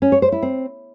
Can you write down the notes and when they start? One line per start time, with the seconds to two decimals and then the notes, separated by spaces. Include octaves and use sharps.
0.02 C#4
0.12 C#5
0.22 C5
0.32 E4
0.42 C4